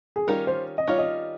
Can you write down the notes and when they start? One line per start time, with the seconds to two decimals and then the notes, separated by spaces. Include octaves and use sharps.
0.16 G#4
0.27 D#3 G3 C#4 F4 A#4
0.47 C5
0.78 D#5
0.87 D#3 G3 C#4 F4 C#5
0.99 D#5